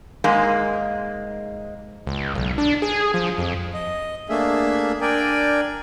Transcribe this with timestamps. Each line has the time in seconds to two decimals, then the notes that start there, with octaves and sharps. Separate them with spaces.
0.24 G#2 G#3 A#3
2.07 C#2
2.35 B1
2.58 D4
2.82 G#4
3.14 F3
3.38 F2
3.74 D#5
4.29 A3 A#3 D4 G#4 E5
5.01 D4 A#4 D5 G5 G#5